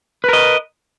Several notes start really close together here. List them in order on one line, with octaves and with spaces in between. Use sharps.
B4 A#4 D#5